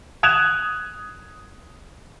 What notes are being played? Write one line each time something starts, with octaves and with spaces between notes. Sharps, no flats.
D#6 F#6 G#6 E7 F7